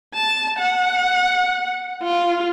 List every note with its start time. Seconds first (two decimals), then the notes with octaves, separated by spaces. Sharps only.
0.14 A5
0.59 F#5
2.03 F4